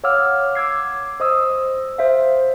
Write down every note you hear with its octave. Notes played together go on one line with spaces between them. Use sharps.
C#5 F5 F#5 D6 E6 F6
D6 E6 G#6 C7
C5 D#5 D#6 E6
C5 E5 F5